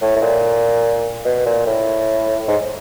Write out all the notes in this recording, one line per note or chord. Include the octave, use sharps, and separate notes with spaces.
A2
A2
A#2
B2
A#2
A2
G#2